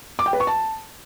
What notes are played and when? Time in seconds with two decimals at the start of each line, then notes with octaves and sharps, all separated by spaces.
0.19 D6
0.26 G5
0.33 B4
0.40 C#6
0.47 A5